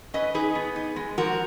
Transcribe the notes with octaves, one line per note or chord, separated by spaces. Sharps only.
C#4 B4 D#5
D#4 G#4 B4
B3
D#4
G#3
F3 F#4 A#4